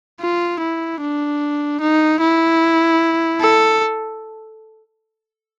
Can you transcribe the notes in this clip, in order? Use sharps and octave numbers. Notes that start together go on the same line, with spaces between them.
F4
E4
D4
D#4
E4
A4